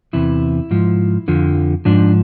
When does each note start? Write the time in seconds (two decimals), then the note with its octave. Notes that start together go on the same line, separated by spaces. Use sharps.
0.13 E2 C3 E3 E4
0.71 G#2 F3
1.28 F2 D3 F3
1.85 G#2 F3 D4